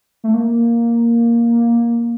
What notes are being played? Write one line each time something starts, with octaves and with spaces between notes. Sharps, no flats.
A3
A#3